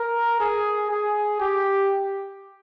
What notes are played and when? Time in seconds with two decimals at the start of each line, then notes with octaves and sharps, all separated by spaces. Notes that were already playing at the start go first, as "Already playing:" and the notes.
Already playing: A#4
0.40 G#4
0.91 G#4
1.40 G4